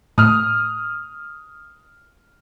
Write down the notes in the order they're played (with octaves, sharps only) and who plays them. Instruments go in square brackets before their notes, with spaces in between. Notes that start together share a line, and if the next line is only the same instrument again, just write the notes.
[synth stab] A2 [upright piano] D#6 F6